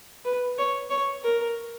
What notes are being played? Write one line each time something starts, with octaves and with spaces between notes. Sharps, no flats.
B4
C#5
C#5
A#4